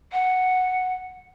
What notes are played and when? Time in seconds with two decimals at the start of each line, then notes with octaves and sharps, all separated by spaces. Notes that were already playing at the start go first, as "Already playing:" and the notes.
0.12 F#5